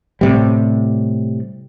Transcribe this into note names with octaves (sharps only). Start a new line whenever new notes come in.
A2 C3 G3